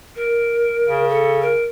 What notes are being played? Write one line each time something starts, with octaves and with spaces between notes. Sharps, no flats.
A#4
C#3
A4
A#4